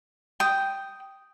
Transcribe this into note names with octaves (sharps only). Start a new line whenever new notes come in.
G5 D#6